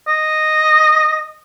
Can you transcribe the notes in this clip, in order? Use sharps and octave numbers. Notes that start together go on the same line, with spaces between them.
D#5